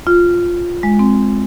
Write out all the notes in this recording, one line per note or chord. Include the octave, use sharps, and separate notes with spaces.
F4
G#3
C4